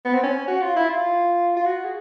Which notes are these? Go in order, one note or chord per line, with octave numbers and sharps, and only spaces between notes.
B3
C4
C#4
F#4
F4
E4
F4
F4
F#4
G#4